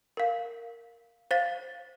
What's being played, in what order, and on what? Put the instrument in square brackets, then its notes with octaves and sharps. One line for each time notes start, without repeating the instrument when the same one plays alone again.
[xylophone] A#4 F5
C5 F5 A6